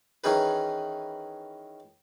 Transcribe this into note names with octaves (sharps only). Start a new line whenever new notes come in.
D#3 E3 C#4 D#4 G#4 B4